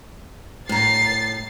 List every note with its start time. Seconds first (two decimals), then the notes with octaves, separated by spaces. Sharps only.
0.69 A2 A#5 A6 C7